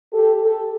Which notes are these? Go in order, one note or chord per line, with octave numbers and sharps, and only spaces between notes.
G4 A4
G4 A4